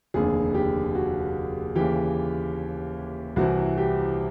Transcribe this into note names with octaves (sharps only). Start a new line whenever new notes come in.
F1 D#2 D3 G#4
G4
F#4
D#2 C#3 E3 G4
C2 C3 E3 F#4
G4